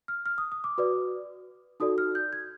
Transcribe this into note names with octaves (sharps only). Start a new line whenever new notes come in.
F6
F6
D#6
D#6
D6
F#4 B4 D5
D#4 F#4 A4 D5 D#6
F6
G6
G#6